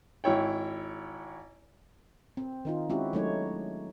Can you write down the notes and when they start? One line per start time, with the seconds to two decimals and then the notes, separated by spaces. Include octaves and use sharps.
0.24 G#1 E4 C#5 G5
2.37 C4
2.65 D#3 D#4 F4
2.90 G#3 C4 C#4 E4 F#4 G4
3.13 F#3 G#3 A3 D#4 C#5